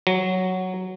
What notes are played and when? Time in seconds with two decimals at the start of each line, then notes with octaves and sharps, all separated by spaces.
0.07 F#3